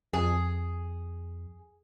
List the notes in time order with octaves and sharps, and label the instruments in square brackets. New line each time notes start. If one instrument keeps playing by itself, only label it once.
[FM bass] F2 [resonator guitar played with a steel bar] G#4